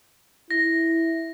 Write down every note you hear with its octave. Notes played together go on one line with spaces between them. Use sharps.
E4 A#6